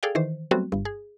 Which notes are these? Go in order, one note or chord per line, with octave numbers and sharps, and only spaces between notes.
G#4 A4 D5 F5 G5
D#3 E3 C5
F#3 G3 A3 B3 C4 F#4
G1 G2
G#4